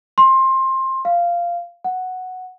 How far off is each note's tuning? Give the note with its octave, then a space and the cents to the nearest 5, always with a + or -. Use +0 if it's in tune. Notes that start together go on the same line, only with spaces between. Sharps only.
C6 +20
F5 -10
F#5 +0